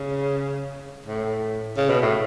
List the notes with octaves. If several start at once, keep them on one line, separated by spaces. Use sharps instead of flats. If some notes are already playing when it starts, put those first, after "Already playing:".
Already playing: C#3
A2
C#3
B2
A2